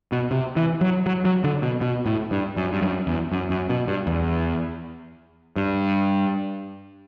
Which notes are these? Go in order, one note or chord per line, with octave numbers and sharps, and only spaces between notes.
B2
C3
E3
F#3
F#3
F#3
D3
B2
B2
A2
G2
F#2
G2
F#2
E2
F#2
F#2
B2
G2
E2
G2